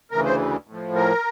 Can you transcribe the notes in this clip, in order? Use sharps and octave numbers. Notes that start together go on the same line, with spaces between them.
D2 C#3 E3 A#4
C5
A2 F3
A#4